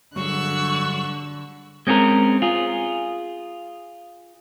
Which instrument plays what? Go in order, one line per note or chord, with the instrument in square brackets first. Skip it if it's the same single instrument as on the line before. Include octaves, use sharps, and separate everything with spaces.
[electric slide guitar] G2 F#3 G#4 [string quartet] D3 [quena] C#6 [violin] E6 F#6
[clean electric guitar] G#3 C4 C#4 G4 A#4
F4 G#4